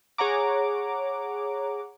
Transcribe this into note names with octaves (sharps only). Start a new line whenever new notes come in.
G#4 C#5 F#5 A#5 D6